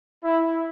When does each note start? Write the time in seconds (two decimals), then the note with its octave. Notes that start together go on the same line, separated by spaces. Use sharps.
0.24 E4